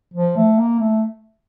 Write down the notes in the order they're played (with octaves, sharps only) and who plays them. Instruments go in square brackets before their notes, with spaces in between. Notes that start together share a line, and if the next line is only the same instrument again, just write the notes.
[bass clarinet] F3
A3
A#3
A3